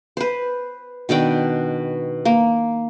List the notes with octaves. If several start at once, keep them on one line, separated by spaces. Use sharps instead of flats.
B4 C5
B2 D#3 D4 G5
A#3